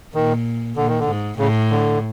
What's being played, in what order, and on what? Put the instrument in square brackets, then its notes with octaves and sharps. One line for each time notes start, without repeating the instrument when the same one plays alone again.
[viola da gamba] A#2 [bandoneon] D#3
[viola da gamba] A#2 [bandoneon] D3
[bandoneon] D#3
D3
[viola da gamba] G#2
[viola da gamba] A2 [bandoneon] C#3
[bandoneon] D3